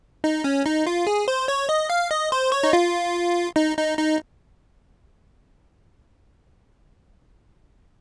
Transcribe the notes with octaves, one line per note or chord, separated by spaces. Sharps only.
D#4
C#4
D#4
F4
G#4
C5
C#5
D#5
F5
D#5
C5
C#5
D#4
F4
D#4
D#4
D#4